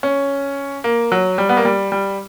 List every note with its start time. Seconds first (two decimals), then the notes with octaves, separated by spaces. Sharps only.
0.03 C#4
0.84 A#3
1.12 F#3
1.38 G3
1.49 B3
1.57 A#3
1.65 G3
1.92 G3